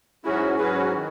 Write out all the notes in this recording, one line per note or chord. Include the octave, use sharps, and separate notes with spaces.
G#2 F#3 C#4 E4 F#4 G#4
G#2 F#3 C#4 F#4 G#4 B4
D#3 G#3